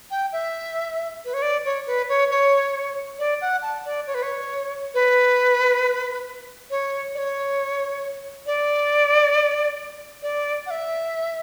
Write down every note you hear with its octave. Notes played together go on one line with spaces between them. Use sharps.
G5
E5
B4
C#5
D5
C#5
B4
C#5
C#5
D5
F#5
A5
D5
C#5
B4
C#5
B4
C#5
D5
C#5
D5
D5
F#5
E5